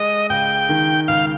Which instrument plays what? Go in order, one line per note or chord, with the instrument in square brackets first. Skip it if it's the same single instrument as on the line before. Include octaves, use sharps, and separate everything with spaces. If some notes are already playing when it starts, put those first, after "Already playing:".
Already playing: [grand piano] G#3 [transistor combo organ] D#5
[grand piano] C#2 [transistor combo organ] G5
[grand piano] D#3
[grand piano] C#2 [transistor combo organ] F5